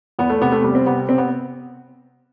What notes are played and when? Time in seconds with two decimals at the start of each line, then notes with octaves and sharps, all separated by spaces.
0.19 E2 B3
0.30 A3
0.41 C3 B3
0.52 A3
0.64 G3
0.75 C4
0.86 C3 B3
1.09 C3 C4
1.18 B3